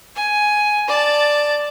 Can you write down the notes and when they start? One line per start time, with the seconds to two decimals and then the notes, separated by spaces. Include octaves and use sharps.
0.15 G#5
0.88 D5 A5